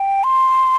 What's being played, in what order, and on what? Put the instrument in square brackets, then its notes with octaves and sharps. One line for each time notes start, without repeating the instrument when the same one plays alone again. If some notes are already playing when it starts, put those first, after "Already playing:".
Already playing: [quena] G5
C6